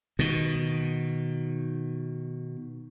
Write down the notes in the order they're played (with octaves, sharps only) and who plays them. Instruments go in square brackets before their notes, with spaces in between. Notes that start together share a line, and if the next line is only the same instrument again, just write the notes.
[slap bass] B2 D#3